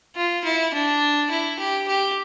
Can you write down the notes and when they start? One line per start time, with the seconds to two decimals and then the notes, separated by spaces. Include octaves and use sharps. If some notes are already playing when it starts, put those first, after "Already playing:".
0.16 F4
0.44 E4
0.74 D4
1.31 E4
1.59 G4
1.88 G4